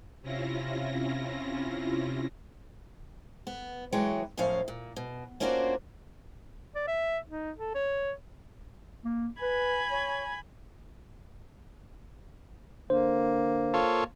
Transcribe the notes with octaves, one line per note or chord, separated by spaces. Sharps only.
C3 C#4 E4 F4 A#6
B3
E3 F#3 G#3 C#5 G5
F#2 A2 F3 C#4 F5
A#2
B2
A#3 C#4 D4 F4 F#4 C5
D5
E5
D#4
A4
C#5
A#3
B4 G#5 B5 G#6
C#5
D3 A#3 C5
F4 A4 C#5